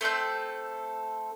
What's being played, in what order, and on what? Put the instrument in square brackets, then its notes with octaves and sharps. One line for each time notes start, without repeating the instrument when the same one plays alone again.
[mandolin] A3 C4 A4 G6